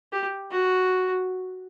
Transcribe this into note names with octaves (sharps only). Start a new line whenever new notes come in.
G4
F#4